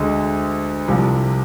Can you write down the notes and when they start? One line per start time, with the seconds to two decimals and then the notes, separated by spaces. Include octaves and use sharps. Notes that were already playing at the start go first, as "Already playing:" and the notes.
Already playing: D2 D3 G#3
0.88 C2 C3 F3